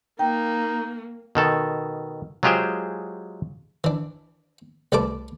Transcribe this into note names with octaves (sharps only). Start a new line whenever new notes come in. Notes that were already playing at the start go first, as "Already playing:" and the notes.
A#3 D#4 G5
B2 D#3 A4
F#3 G#3 F4 G4 G#4 C5
E3 D4
C2 G3 A3 B4 A5 D6